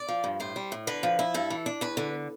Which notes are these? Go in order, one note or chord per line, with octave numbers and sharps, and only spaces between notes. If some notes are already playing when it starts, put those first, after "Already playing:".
Already playing: D5
F3
G2
A2 C5
G3
A2
D3 B4
F3
E4
G2 A4
E3
D4
E2 B4
D3